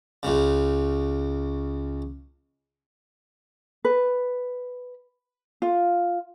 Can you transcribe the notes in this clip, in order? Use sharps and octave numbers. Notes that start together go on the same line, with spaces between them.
C#2 C#3
B4
F4